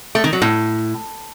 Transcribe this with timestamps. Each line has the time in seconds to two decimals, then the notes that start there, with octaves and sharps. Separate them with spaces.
0.15 A3
0.24 D#3
0.33 F#3
0.42 A2